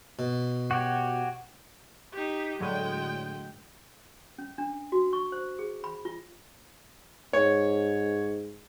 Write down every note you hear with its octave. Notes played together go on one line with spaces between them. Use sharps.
B2
F#4 G4 C#5
D#4 G4
A2 D3 F#3 G#3 G5
C#4
D4
F#4
C#6
C5
G#4
B5
F4
G#2 C#5